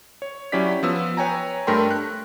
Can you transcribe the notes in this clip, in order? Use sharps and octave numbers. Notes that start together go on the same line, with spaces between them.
C#5
F#3 C#4 E4 G4 D5 B6
F3 B3 E6
B4 C#5 G5 G#5 A#5
G2 A3 A#4 G5 C6
F#6